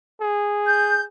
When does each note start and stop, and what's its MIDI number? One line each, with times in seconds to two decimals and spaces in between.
0.21 1.07 68
0.66 1.03 91